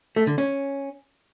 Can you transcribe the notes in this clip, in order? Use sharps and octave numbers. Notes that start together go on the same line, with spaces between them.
A3
D3
C#4